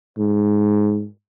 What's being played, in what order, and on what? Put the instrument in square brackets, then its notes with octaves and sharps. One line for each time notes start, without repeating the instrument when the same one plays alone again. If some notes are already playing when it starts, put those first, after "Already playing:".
[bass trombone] G#2